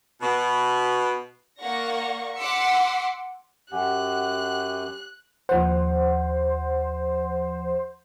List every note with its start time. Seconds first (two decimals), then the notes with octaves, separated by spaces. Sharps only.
0.21 B2
1.59 A#3 D5 F#5 C#6 A#6
2.37 F#5 C6 D6 E6 B6 C#7
3.72 F#2 G4 F#5 G#5 F#6
5.49 D#2 F3 C5 F#5